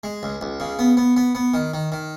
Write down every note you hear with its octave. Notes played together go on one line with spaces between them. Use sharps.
G#3
C#2
C#2
C#3
B3
B3
B3
B3
D#3
D#3
D#3